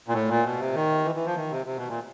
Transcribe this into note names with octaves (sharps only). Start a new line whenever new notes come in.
A#2
A2
A#2
B2
C3
D#3
E3
E3
F3
D#3
C3
C3
B2
A#2